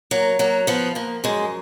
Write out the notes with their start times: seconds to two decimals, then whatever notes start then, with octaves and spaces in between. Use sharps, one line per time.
0.11 F#3 A#3
0.39 F#3 A#3
0.67 F3 B3
0.95 F3 A#3
1.24 F#2 G#3